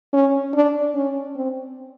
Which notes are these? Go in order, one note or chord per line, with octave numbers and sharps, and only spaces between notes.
C#4
D4
C#4
C4